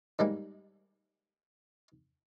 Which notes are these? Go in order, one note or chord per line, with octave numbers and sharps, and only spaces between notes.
G#2 G3 G#3 A#3